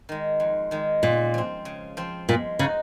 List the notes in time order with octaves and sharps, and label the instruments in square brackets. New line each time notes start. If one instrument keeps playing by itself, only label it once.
[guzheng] D#3 G#3
F2
D#3 G#3
[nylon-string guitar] A#2 [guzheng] C#3
[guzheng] F3 C4
C#3
F3 C4
[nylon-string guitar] A#2 [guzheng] G#3
[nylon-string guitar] C#3 [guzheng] D#4 F#4